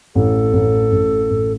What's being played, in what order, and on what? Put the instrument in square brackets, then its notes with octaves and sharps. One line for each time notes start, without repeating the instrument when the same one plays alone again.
[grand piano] A1 [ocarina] A4
[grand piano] A1
A1
A1